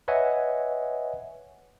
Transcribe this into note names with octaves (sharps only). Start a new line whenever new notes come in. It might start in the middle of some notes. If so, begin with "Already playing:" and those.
B4 C#5 D#5 E5 F#5 G#5